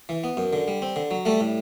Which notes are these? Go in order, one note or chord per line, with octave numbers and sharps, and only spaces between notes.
E3
B3
F#2
D3
G3
C4
D3
F#3
G3 A3 A4
A2